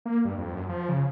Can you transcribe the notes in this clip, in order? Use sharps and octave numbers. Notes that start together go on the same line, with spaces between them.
A#3
G2
F2
F#2
F3
C#3